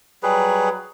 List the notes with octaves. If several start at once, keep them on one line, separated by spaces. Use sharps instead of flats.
F#3 G3 G#4 B4